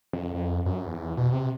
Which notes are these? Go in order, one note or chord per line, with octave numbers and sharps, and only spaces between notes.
F2
F2
F#2
E2
B2
C3